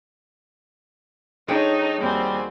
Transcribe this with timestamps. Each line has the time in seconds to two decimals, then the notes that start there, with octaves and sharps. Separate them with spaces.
1.48 F3 D4 D#4 G#4 A4 C#5 G5
2.01 D#2 G3 C4 F#4 G#5